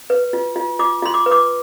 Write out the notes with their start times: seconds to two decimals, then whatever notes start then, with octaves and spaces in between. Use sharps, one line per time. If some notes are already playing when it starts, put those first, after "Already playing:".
0.10 B4
0.33 F4
0.56 F4
0.79 F4 D6
1.02 F4 C6
1.14 D6
1.26 B4
1.31 D6